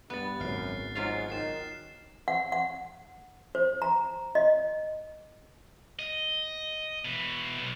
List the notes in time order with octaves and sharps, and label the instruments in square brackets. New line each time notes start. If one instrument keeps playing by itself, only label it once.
[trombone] G2 [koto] B3 [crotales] F#6 A6
[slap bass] G#1 C#3 [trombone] F#2 [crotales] F6 C7
[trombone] G#2 [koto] F#3 F4 F5 [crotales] A6
[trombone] D#3 [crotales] A6 C7 E7
[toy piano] F#5
F#5
C5
A#5
D#5
[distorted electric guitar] D#5
B2 E3
B1